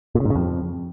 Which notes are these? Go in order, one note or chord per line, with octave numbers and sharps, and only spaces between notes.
A#2
C#3
G#2
C#3
F2